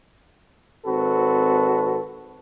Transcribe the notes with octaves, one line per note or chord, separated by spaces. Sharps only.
G#1 C4 F#4 A4 B4